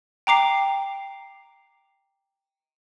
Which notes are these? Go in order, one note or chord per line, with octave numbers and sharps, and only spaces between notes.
G5 A#5 D6 C7